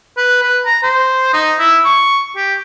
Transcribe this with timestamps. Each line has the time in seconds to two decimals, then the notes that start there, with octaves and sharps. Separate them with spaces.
0.17 B4
0.43 B4
0.66 A#5
0.83 C5
1.33 D#4
1.59 E4
1.85 C#6
2.36 G4